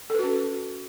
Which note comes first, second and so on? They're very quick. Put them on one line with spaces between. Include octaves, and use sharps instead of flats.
A4 B4 F#4 C#4